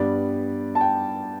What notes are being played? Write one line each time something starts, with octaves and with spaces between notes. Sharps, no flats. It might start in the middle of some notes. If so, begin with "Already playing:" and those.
Already playing: G2 G3 B3 D5
A5
G5